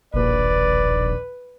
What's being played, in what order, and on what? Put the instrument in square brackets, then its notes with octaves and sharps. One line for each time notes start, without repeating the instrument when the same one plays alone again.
[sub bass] E1 [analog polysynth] A#1 D#2 [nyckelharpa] B4 [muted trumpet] D5